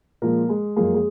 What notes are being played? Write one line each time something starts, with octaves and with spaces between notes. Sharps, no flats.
A#2 F3 G#3 A#3 A#4
G#3 G#4
F#2 F3 G#3 A#3 G#4
G#3 G#4